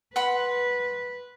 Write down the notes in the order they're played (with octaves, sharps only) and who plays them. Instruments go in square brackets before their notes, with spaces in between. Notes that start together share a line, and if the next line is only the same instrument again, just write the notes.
[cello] B4 [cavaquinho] F#5 B5 C6